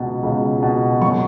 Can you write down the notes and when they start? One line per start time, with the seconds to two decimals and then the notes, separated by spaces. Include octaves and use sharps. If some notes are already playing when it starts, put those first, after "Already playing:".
Already playing: C#2 B2
0.23 C#2
0.63 B2
1.02 F#2 C#6